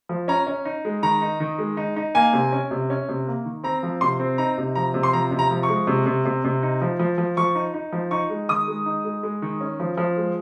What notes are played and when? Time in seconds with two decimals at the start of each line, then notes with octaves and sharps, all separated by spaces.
0.09 F3
0.28 C#4 A#5
0.47 C#4
0.65 D#4
0.85 G#3
1.03 D#3 A#5
1.21 D#4
1.40 D#3
1.59 G#3
1.77 D#4
1.96 D#4
2.15 A#3 G#5
2.33 C3
2.53 C#4
2.71 C3
2.90 C#4
3.09 C3
3.27 A#3
3.45 D#3
3.64 C4 A#5
3.83 F3
4.01 C3 C6
4.20 C4
4.38 D#4 A#5
4.58 C3
4.75 F3 A#5
4.94 C3
5.03 C6
5.13 F3 A#5
5.31 C3
5.39 A#5
5.51 F3
5.63 C#6
5.69 G#3
5.87 C3
6.06 C3
6.25 C3
6.44 C3
6.63 D#4
6.81 F3
6.99 F3
7.18 F3
7.37 F3 C#6
7.55 D#4
7.74 D#4
7.93 F3
8.11 D#4 C#6
8.30 G#3
8.49 D#3 D#6
8.68 G#3
8.86 D#4
9.05 G#3
9.23 G#3
9.42 D#3
9.61 C#4
9.80 F3
9.97 F3
10.17 G#3